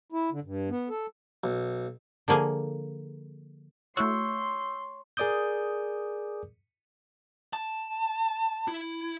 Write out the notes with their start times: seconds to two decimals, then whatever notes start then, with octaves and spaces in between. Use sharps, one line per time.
0.12 E4
0.32 D3
0.43 G2
0.69 B3
0.89 A4
1.44 B1
2.28 D3 F3 A#3 G#4
3.97 A3 E4 F#4 C#5 C6 E6 G6
5.17 G#4 A#4 D5 D6 D#6 G6
7.53 A5
8.68 E4